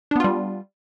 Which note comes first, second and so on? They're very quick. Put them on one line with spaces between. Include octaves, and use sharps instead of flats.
D4 B3 F4 G3